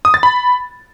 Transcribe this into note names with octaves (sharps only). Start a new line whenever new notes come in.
D#6
A6
B5